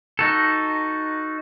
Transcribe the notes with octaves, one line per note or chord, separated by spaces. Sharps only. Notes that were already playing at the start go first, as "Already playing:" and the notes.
D#4 F#4 A4